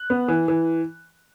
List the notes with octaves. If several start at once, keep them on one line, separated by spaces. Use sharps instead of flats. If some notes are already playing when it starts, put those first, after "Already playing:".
Already playing: F#6
B3
E3
E3